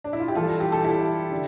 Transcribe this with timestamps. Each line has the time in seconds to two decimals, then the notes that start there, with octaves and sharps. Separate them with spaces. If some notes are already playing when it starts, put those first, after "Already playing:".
0.04 D4
0.13 E4
0.20 F4
0.28 G4
0.35 G2 E3 F4 A4
0.60 G4
0.72 A4
0.84 E4 G4
1.32 D3